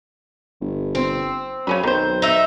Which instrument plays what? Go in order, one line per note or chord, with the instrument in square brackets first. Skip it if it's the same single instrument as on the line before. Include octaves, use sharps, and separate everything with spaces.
[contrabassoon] G1
[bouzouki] C4
[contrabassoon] F#2 [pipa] C#3 C#4 B5
[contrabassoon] B1 [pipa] D#3 C5
[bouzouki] D#4 E5